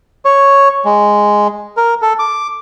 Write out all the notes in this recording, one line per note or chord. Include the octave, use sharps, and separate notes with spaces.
C#5
G#3
A#4
A4
D6